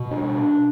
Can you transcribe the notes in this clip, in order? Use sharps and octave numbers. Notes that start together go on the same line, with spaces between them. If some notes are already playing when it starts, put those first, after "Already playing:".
Already playing: B2
D4